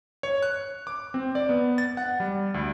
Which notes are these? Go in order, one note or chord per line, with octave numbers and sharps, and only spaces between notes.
C#5
F#6
D6
C4
D5
B3
A6
F#5
G3
D2